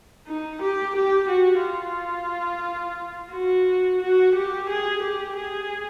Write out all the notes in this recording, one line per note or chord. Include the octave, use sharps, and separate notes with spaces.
D#4
G4
G4
F#4
F4
F#4
F#4
G4
G#4
G4
G#4